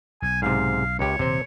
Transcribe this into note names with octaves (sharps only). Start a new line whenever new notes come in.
B1 G#5
G#2 C3 F5
C#2 G4 C#5
D#1 C3 C5